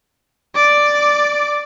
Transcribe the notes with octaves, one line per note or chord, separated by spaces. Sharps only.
D5 D6